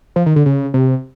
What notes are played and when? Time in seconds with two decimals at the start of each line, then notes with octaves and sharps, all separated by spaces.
0.16 F3
0.26 D#3
0.36 D3
0.46 C#3
0.74 C3